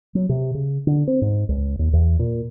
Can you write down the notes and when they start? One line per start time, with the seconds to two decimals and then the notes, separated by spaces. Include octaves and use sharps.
0.15 F#3
0.29 C3
0.55 C#3
0.87 D3
1.07 C4
1.22 G#2
1.49 C#2
1.79 D#2
1.93 E2
2.19 A#2